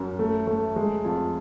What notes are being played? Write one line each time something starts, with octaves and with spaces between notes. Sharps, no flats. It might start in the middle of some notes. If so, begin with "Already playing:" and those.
Already playing: F#2
A3
A3
G#3
F2